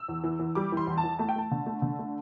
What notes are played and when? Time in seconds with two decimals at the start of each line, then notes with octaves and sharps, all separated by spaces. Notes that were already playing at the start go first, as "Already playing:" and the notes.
Already playing: E6
0.08 E2
0.24 E3
0.40 E3
0.55 G3 D6
0.72 E3 C6
0.87 E2
0.98 A5
1.04 E3
1.19 A3 A5
1.29 G5
1.36 A3 A5
1.51 D3
1.66 A3
1.82 D3
1.99 A3